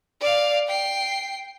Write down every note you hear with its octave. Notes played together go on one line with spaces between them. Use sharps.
D5 F5
G5 C7